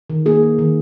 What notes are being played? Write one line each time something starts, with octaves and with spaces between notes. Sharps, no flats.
D#3
A#3 G#4
A#3
D#3